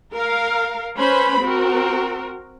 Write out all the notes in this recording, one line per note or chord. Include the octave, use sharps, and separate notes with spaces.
A#4 F5
C#4 B4 C5 B5
C4 F#4 A#4